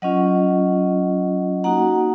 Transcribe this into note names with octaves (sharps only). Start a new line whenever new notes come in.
F#3 C#4 F4 D#5 F#5
A#3 D#4 F#4 F#5 A#5